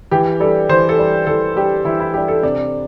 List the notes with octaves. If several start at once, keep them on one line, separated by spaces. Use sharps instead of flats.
E3 G4
G3 D4 A4
E3 C5
A4
G3 D4
E3 A4
G3 D4 G4
E3 E4
E4
G3 D4 G4
A4
C3 D4